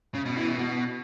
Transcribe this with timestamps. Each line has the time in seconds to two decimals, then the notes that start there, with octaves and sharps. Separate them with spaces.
0.15 C#3
0.26 B2
0.37 E3
0.48 B2
0.59 B2